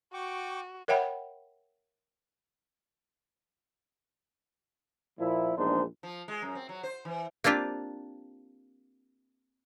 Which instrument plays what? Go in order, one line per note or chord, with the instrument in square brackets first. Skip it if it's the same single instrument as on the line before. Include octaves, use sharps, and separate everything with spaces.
[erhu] F#4 [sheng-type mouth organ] G5 C#6 D6
[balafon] A#4 C#5 E5 F#5 G5 B5
[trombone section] A#2 F3 E4
A#1 E2 G#3 D4 D#4 C5
[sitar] F3
G#3
F#2
C4
F#3
C5
E3
[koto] A#3 C4 D4 F4 G4